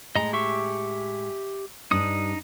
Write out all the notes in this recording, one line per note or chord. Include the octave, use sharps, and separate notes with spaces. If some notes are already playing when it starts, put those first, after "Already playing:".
A2 G#3 D#5 A#5
G4 E5 C#6
G2 G3 D4 D#4 D#6